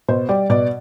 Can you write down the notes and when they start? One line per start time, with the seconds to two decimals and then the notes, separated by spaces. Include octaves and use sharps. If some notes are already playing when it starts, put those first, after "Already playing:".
0.08 B2 C5
0.29 G3 D5
0.50 B2 D5